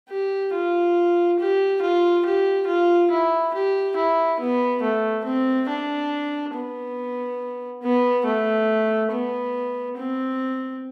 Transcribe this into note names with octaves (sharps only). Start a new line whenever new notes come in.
G4
F4
G4
F4
G4
F4
E4
G4
E4
B3
A3
C4
D4
B3
B3
A3
B3
C4